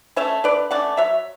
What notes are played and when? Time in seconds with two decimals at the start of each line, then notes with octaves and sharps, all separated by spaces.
0.16 A3 C#4 C#5 E5
0.44 D3 B4 D5
0.71 A3 C#4 D5 F#5
0.97 F#3 C#5 E5